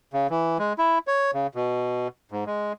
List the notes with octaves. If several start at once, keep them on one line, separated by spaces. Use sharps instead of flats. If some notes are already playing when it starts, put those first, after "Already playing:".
C#3
E3
G#3
E4
C#5
C#3
B2
G#2
G#3